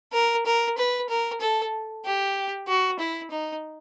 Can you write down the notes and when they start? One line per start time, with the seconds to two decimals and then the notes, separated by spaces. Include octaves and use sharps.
0.13 A#4
0.46 A#4
0.78 B4
1.10 A#4
1.41 A4
2.05 G4
2.68 F#4
2.99 E4
3.31 D#4